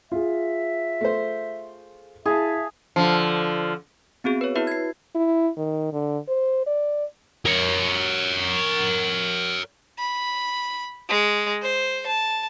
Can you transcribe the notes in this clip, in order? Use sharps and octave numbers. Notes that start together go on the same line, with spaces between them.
F4 G#4 E5
A3 C5
E4 G#4 E5 F5 A5
D3 F3
B3 C4 F#4 G#4
B4 C#5
E4 F#4 B4 E5
G#6 C7
E4
D#3
D3
C5
D5
A#4 C#5
B5
G#3
C5
A5